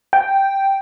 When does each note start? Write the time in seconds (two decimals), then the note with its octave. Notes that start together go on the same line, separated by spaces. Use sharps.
0.13 G5